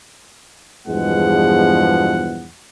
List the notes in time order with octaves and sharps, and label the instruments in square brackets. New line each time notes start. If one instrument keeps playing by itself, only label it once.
[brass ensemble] E2 G2 B2 F3 G#3 F#5